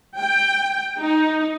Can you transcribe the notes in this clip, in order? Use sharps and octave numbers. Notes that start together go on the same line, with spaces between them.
G5
D#4